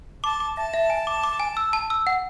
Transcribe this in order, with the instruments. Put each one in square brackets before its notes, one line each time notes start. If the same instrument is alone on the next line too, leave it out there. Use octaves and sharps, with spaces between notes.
[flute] A5 [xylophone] D6
[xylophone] D6
[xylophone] E5 [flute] A5
[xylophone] E5
G#5
D6
D6
G#5
E6
A5
E6
F#5